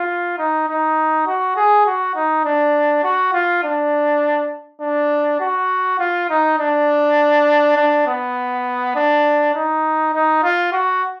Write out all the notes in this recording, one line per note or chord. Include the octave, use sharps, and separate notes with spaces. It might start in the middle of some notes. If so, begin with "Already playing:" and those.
Already playing: F4
D#4
D#4
F#4
G#4
F#4
D#4
D4
F#4
F4
D4
D4
F#4
F4
D#4
D4
D4
B3
D4
D#4
D#4
F4
F#4